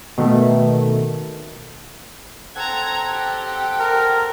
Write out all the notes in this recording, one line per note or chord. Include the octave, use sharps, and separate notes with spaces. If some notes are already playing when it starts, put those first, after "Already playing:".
B2 D#3 A3
C4 A4 F#5 A#5 G#6
G4
A#4